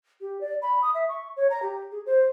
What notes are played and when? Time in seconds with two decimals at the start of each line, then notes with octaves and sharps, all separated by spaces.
0.21 G4
0.41 D5
0.62 B5
0.82 D#6
0.94 E5
1.09 C#6
1.37 C#5
1.50 A#5
1.62 G4
1.92 G#4
2.06 C5